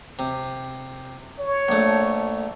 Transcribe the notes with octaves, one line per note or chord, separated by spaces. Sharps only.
C3
C#5
A#1 A3